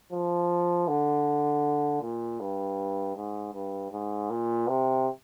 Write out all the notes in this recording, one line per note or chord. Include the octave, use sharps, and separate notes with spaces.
F3
D3
A#2
G2
G#2
G2
G#2
A#2
C3